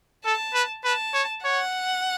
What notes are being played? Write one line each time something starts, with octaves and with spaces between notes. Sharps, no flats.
A4 A5
B4
B4 A5
C#5
C#5 F#5